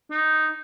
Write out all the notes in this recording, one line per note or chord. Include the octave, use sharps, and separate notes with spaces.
D#4